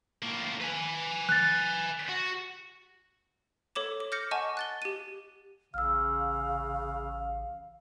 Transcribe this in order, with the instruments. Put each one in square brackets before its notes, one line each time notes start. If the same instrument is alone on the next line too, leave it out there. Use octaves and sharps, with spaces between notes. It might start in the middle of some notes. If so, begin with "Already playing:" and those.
[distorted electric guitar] A2 A#3
B4 G#5
[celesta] F#6 A6
[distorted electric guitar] F#4
[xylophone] A4 C#5 D6 E7
D6
D6 F6 G6 A#6 C#7
D#5 F#5 G#5 A5 C#6
F#6 A6 G7
G4 D#7
[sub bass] A1 [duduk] C#3 [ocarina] F5 [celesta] E6 F6